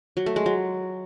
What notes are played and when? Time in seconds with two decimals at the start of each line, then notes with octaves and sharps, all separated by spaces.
0.17 F#3
0.26 A3
0.36 G#3
0.46 F#3